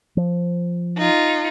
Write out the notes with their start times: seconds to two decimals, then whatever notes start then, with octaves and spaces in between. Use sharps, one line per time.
0.17 F3
0.98 D#4 F4